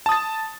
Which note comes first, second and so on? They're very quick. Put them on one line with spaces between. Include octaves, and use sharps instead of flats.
A5 D#6 A6